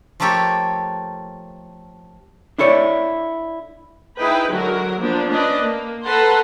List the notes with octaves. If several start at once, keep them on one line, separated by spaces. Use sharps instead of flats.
F3 A3 A#3 G4 A4 C#5
D4 E4 A4 C#5 D5
D#4 E4 G#4 B4 G5
D3 F#3 G#3 F#4 A#4
F3 A#3 B3 D4
C#4 D4 B4 D5 D#5
A#3
A4 B4 F#5 A5 A#5 C6